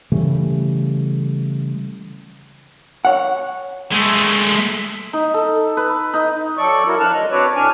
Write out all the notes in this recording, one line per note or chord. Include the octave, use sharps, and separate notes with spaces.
C#3 E3 G3 A3
C#5 F#5
G#3 A3
D#4
A4
B4
D#4
F#3 A4 D5 C#6
E4 F#4 A#4
F3 D4 A5 F6 F#6
G#3 D#5
C4 D4 F#4 B4 C#5 D5
A2 D4 G#5 F6